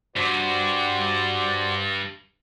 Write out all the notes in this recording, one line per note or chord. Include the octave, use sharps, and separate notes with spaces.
G2 F#4 C5 D5